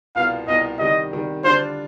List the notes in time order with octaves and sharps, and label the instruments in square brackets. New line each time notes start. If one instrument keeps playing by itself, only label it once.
[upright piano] C2 B2 B3 F4 [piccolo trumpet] F5
[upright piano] C2 B2 B3 F4 [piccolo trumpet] D#5
[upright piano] C3 D#3 G3 [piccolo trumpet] D#5
[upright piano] C3 D#3 G3
[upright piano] D3 G3 D4 F4 [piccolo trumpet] C5